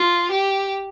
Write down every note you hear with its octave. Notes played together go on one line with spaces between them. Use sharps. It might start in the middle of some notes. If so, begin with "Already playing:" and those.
Already playing: F4
G4